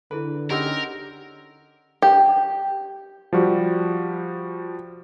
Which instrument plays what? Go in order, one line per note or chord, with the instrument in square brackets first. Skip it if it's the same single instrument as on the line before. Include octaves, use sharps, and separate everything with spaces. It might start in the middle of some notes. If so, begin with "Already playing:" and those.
[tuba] D3 [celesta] E4 G#4 A4 [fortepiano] B4
[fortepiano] C#4 D#4 G4 [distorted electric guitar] A#4 [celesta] F#5 C6 E6
[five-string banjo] G4
[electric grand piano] F3 G3 F#4